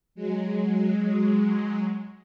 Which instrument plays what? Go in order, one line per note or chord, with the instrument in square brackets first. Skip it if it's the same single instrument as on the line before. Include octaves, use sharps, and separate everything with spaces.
[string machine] F#3 G#3